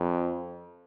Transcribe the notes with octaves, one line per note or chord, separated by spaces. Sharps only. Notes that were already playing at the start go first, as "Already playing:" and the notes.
Already playing: F2